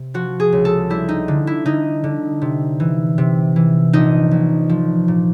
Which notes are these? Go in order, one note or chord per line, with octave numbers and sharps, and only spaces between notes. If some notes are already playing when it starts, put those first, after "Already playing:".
Already playing: C3
F3 F#4
G#4
C#2
A4
G3 E4
D#4
D3
E4
D3 D#4
D3
C3
E3
C3
E3
A#1 D#4
A#1
F3
A#2